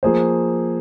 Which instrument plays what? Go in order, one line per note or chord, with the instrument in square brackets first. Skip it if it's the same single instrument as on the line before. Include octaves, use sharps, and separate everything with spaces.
[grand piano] F3 A#3 G#4 C5